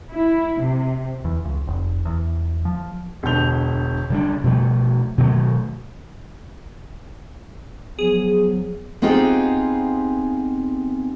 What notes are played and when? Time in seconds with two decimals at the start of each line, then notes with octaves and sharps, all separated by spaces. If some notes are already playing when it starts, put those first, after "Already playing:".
0.11 E4
0.60 C3
1.25 E2
1.45 C#2
1.67 F1
2.05 E2
2.65 F3
3.23 E1 B2 D3 G6 F7
4.10 C#3 G3 D4
4.44 B2 F3 G3 A3
5.18 B2 D#3 F#3 A3
7.99 F3 F#3 B3 G#4
9.02 B3 C4 D#4 F4 G4 G#4